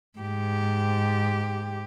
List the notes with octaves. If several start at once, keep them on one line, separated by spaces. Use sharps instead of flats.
G#2 G4